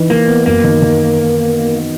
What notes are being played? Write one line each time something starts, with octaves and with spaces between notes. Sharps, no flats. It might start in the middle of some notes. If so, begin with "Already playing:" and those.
Already playing: E3 D#4
E3 A#3
B3
F#2 A#3
D#3
D#3